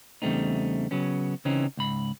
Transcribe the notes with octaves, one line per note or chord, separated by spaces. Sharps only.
E2 C#3 G3 A3 C4 D#4
C#3 F#3 B3 C#4
C#3 E3 C4 C#4 D#4
C#2 G#2 B5